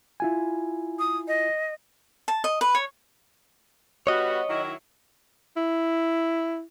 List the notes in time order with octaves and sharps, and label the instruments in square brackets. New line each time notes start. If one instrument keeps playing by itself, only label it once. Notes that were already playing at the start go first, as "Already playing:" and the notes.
[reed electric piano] E4 F4 G#5
[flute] D#6
D#5
[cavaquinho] A5
D#5
B4
C#5
[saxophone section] G3 B3 F#4 [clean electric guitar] C#5 D#5
[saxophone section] D#3 F#3 E4
[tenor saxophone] E4